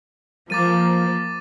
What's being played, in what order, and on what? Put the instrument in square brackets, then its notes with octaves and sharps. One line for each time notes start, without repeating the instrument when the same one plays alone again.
[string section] F3 A#3 [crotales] D6 A6 D#7